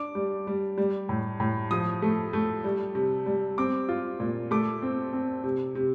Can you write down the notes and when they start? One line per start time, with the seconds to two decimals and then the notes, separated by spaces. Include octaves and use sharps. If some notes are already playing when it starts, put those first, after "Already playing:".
Already playing: D4 D6
0.15 G3
0.47 G3
0.78 G3
1.09 A2
1.40 A2
1.71 F3 D#6
2.02 A3
2.33 A3
2.64 G3
2.95 C3
3.26 G3
3.58 C4 D6
3.89 F4
4.20 A#2
4.51 A3 D6
4.82 C4
5.13 C4
5.44 C3
5.75 C3